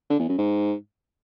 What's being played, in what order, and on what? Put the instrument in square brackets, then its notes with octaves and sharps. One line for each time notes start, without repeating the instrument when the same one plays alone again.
[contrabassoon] D3
E2
F#2
G#2